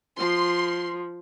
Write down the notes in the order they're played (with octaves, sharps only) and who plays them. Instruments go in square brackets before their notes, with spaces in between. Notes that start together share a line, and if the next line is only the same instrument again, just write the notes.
[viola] F3 [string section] C6